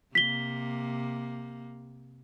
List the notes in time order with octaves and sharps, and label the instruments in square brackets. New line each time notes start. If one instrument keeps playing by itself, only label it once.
[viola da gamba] C3 A#3 [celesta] B6 G7